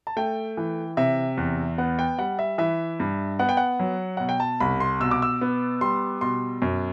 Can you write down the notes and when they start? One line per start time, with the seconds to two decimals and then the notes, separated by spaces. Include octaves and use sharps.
0.07 A5
0.17 A3 G5
0.57 E3
0.97 C3 E5
1.37 E2
1.78 B3 F#5
1.99 G5
2.18 G3 F#5
2.39 E5
2.58 E3 E5
3.00 G2
3.39 B3 F#5
3.49 G5
3.57 F#5
3.80 F#3
4.17 B2 F#5
4.29 G5
4.40 A5
4.60 C2 B5
4.80 C6
5.00 B2 E6
5.11 D6
5.22 E6
5.41 B3
5.81 G3 C6
6.21 B2 C6
6.62 F#2